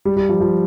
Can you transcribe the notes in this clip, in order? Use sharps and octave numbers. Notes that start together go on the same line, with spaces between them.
G3
G3
F3
F3